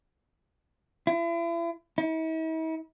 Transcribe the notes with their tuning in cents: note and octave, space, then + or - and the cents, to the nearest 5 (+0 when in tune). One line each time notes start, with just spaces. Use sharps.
E4 +40
E4 -45